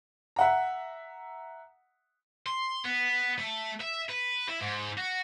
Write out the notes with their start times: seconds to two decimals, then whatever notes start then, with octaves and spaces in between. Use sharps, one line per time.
0.36 E5 F#5 A#5
2.46 C6
2.84 B3
3.39 A3
3.81 E5
4.10 B4
4.49 E4
4.61 G#2
4.98 F#4